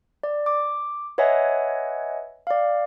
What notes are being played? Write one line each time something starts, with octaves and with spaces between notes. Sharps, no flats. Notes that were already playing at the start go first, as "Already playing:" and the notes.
D5
D6
B4 C#5 D#5 E5 F#5 G#5
D5 F5